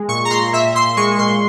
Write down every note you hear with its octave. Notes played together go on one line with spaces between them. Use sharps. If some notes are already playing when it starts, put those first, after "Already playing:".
Already playing: G#3
A#2 C#6
A#5
A#2 C6
A#2 E5
A#2 C6
G#3 C#6
A#2 C6